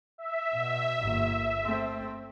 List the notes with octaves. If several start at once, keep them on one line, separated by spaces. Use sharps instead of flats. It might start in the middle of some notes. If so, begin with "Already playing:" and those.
E5
B2
G1 A#3
A3 C4